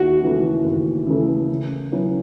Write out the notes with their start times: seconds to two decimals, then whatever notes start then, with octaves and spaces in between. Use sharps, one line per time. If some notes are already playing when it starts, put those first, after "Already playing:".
Already playing: D#2 F#4
0.22 C#3 E3 A3 E4
0.64 D#2
1.07 C#3 E3 A3 E4
1.49 C#3
1.92 F#3 C#4 E4 B4